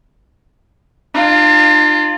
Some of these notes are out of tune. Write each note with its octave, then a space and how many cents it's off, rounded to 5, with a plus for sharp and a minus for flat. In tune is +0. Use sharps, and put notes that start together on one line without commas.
D4 +45 F4 +0